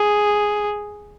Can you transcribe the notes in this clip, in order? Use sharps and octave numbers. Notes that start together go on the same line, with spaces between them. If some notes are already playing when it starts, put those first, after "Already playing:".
Already playing: G#4